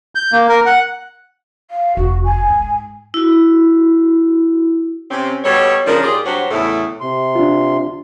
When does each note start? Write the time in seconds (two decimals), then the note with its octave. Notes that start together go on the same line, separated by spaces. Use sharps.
0.15 G6
0.32 A#3
0.49 A#4
0.66 F#5
1.71 F5
1.97 F1 F#4
2.24 G#5
2.50 G#2
3.14 E4 F#4
5.10 C3 C4 C#4
5.44 B2 G3 A4 C#5
5.86 C#3 F3 C#4 D4 A#4
6.03 D#2 F4 G4 G#4 D5
6.25 G2 F#3 D4 F#4 C5 C#5
6.50 E2 A2 C#3 A3 E4 A4
7.01 C3 C6
7.35 D4 F4